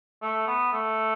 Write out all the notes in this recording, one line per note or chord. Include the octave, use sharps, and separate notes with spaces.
A3
B3
A3